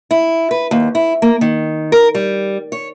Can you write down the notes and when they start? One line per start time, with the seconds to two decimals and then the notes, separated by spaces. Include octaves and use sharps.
0.11 E4
0.51 B4
0.71 D#2
0.95 E4
1.22 A#3
1.41 D#3
1.92 A#4
2.15 G3
2.72 C#5